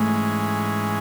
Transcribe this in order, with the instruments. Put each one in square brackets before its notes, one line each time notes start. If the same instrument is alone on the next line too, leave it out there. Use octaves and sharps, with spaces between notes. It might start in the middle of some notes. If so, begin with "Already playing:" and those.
Already playing: [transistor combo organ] G#2 E3 G#3 C#4 [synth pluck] A3